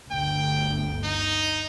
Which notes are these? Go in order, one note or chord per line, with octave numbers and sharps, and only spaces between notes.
G1 D2 G5
D#4